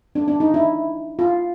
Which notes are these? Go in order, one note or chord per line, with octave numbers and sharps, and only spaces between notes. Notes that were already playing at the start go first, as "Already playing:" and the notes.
D4
D4
D#4
E4
F4